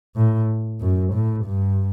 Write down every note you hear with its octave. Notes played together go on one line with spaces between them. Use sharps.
A2
F#2
A2
G2